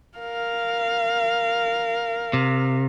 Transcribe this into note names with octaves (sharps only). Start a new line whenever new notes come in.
A#4 F5
C3